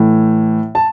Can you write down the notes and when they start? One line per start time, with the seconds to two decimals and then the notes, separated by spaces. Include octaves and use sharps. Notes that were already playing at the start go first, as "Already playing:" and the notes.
Already playing: A2 E3 A3
0.75 A5